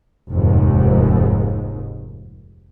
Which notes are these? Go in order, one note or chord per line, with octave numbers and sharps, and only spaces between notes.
F1 D#2 G#2